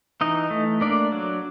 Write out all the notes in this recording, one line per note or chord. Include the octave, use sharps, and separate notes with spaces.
E3 D#4 D#5
A3
A#3 D4 D5
F#3